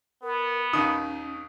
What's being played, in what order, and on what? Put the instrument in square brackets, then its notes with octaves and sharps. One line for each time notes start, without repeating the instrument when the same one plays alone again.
[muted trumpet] B3 [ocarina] A#4
[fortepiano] A#1 D#2 D#3 [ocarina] C#4 [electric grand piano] D#6